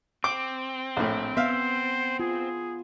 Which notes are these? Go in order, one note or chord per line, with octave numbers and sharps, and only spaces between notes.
C4 D6
A#1 A2
B3 C5 E5 F5
F4 G#4